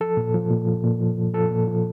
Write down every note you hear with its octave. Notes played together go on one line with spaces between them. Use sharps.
F3 A4
A#2
F3
A#2
F3
A#2
F3
F3
F3 A4
A#2
F3